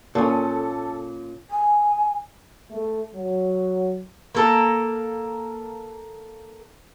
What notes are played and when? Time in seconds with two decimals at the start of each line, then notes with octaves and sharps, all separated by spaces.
0.15 A#2 C#4 A4
1.51 G#5
2.71 A3
3.14 F#3
4.35 A#3 A4 A#4